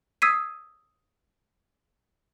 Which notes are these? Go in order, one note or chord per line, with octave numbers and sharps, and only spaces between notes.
D#6 E6 G#6 B6 C7 D#7